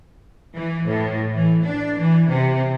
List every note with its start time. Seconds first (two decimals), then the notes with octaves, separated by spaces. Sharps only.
0.55 E3
0.88 A2
1.34 E3
1.65 D4
1.99 E3
2.30 C3